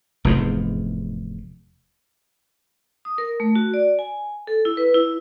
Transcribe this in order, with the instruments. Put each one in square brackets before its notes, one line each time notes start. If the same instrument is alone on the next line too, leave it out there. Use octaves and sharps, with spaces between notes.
[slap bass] F1 E2 G#2
[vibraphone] D#6
A#4
A3
F#4
D5
G#5
A4
E4
B4
E4